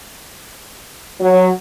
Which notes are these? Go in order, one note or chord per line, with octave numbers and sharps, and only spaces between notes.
F#3